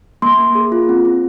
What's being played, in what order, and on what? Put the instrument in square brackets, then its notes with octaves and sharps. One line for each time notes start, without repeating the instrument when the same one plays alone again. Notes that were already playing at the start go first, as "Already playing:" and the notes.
[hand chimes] A#3 C6
A#3
G#4
F4
C4
C4